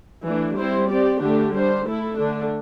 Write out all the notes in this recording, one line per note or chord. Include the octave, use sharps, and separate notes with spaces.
E3 A3 D4
G3 C4 E4 C5
C4 G4 D5
D3 A3 D4 G4
G3 D4 C5
A3 E4 A4
D3 A3 D4